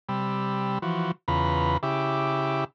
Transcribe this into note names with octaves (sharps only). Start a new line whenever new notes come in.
C3 G3 B5 E6
E3 F3 F#4
E2 C#3 F4 B4 A#5 B5
C#3 E4 G4 E5 D6